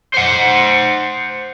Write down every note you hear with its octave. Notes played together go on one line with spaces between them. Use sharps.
C5 F#5